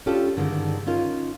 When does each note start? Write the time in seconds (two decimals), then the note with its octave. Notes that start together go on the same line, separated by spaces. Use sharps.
0.06 C#4 D4 F4 G4 A4
0.37 G2 D3 D#3 G#3
0.87 C#4 D#4 F4 A#4